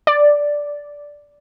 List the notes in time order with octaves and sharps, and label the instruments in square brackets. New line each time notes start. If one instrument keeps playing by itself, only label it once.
[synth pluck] D5